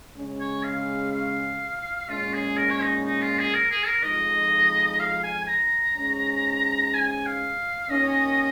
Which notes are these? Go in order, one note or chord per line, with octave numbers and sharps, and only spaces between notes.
C#3 G#3 C#4
C#5
F5
F5
A#2 G#3 C#4 F4
G#4
A#4
C#5
D#4
D#4
F4
G#4
A#4
G#4
A#4
F2 F3 G#3 D#4 D#5
F5
G#5
G#5
A#5
G#2 G#3 C#4
G#5
G#5
F5
D#2 D#3 C#4 D#5